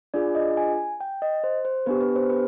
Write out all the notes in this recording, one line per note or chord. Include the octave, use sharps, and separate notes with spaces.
D4 F4 G#4 D5
D#5
G#5
G5
D#5
C5
C5
B3 D4 G4 B4
B4
C5
B4